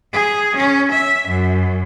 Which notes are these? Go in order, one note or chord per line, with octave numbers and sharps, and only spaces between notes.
G#4
C#4
E5
F#2